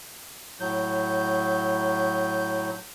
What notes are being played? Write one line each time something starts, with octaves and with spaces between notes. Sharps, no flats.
A2 F#3 G6